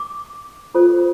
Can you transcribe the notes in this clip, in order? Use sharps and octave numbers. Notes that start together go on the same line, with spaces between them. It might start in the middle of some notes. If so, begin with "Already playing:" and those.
Already playing: D6
F4 A4 C5